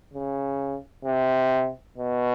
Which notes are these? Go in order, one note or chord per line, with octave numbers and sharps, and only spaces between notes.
C#3
C3
B2